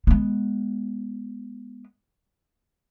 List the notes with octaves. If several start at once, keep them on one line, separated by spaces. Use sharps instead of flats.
G#3 B3